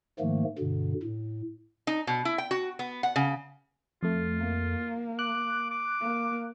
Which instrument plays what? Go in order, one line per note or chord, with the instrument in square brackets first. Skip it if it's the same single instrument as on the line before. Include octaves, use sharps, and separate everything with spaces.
[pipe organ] G#2 D#3 F3 A3 A#3
G2 B2 D3
A2
[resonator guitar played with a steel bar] D#4
B2
E4
G5
F#4
B3
F#5
C#3
[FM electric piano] F2 A3 [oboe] F4
[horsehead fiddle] A#3
[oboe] D6 [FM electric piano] F#6
[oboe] D6
[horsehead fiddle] A#3